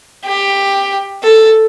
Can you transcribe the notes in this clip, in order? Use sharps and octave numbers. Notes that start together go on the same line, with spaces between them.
G4
A4